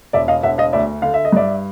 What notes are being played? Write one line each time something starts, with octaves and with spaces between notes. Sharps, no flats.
E1 D5 E5
D#5 F5
E1 E5 F#5
D#5 F5
D2 D5 E5
D3 F5
E5
D#5
G2 D5 E5